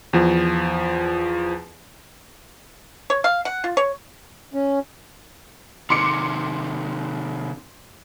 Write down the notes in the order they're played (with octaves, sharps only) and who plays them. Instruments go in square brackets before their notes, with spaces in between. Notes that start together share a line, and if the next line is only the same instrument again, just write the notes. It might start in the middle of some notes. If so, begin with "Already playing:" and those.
[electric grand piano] E2 F3
[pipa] C#5
F5
F#5
F4
C#5
[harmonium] C#4
[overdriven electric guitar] C3 D#3 [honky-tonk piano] C6 D6 C#7